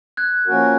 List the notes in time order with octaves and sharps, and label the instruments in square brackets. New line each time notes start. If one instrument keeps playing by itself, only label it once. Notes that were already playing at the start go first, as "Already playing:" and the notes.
[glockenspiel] F#6 G#6
[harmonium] F3 A#3 C#4 F#4 A#4